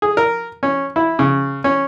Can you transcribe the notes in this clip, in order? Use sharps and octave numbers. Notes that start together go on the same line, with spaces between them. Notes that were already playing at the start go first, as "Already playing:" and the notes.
G#4
A#4
C#4
E4
C#3
C#4